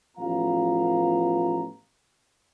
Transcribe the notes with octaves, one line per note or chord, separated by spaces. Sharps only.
A1 F3 B3 F4 F5 A#5